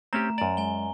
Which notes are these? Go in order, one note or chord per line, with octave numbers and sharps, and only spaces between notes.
A3 C4 C#4 G4 A#5
F#2 D5 A#5
G#3 G#5 G7